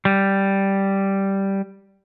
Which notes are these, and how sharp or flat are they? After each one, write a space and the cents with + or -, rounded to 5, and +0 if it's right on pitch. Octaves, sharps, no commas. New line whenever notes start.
G3 -5